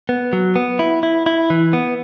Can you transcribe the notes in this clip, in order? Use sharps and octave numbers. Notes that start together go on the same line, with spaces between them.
B3
F#3
B3
E4
E4
E4
E3
B3